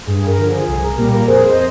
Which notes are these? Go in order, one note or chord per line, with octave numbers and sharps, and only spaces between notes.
G2 G#4
A#4
D3 F3
G#4
C2 G#4
A#4
A#2 G3 A#3 A#4
A#4
F2 G#4 C5
C5 D#5